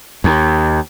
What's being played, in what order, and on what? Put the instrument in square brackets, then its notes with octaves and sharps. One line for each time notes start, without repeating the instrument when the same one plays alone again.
[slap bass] D#2